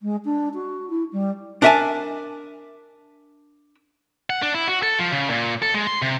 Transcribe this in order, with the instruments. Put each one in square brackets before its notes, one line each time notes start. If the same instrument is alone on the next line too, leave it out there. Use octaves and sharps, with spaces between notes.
[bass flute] G#3
D4
F#4
E4
G3
[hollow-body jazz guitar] D4 A#4 E5 F#5 G#5 A5
[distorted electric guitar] F#5
D4
E4
F#4
A4
F3
C#3
A#2
A4
G#3
C6
C3